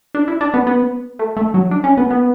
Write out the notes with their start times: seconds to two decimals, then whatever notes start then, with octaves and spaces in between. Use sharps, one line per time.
0.15 D4
0.28 E4
0.41 D4
0.54 B3
0.67 B3
1.19 A3
1.37 A3
1.54 F#3
1.71 D4
1.84 C#4
1.97 B3
2.11 B3